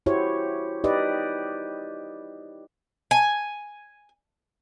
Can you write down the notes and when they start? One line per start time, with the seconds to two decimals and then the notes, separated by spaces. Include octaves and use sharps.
0.06 E4 F#4 G4 C5 C#5
0.84 D#4 G4 B4 D5 D#5
3.11 G#5